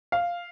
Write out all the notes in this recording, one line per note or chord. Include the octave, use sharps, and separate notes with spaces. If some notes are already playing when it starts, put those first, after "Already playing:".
F5